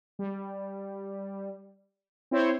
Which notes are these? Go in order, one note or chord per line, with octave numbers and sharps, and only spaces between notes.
G3
C4 E4 C5 C#5